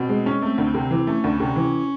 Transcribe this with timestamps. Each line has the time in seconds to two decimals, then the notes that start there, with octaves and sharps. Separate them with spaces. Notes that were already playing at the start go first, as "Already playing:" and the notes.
Already playing: B2 C4
0.09 G#3
0.26 C#4
0.42 A3 C4
0.58 D2
0.74 C3
0.91 E3
1.07 A3 C#4
1.24 D2
1.40 C3
1.56 E3